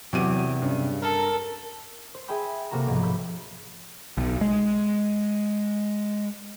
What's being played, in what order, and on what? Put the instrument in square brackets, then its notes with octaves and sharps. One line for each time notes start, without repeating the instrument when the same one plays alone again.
[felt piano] E2 D6 D#7 [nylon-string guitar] C3 [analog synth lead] F#3
[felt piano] G2 [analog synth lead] C#3
[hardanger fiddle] A4 [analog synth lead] A#4
[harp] C5
G#4 E5 G5 B5 G6
C3 A3 A#3 F#4 A#5 E7
B1 G#2 F3
B5 E6 G6
[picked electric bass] B1
G#3